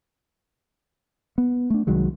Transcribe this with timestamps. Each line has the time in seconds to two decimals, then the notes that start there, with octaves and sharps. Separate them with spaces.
1.38 B3
1.70 A3 D4
1.87 C2 D#3 F#3 G#3